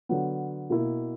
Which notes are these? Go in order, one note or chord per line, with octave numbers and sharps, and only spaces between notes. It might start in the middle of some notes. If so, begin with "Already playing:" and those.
D3 F#3 B3
B2 A#3 E4